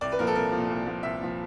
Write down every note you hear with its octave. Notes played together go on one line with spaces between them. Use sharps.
C2 D5
B4
A#2 F3 A#4
A4
C2 A#4
F3
A#2
C2
A#2 F3
C2 E5
A#2 F3